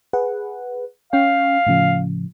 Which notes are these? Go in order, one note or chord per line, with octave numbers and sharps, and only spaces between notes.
G#4 B4 F#5
C#4 C#5 F5 G5
A2 C#3 F3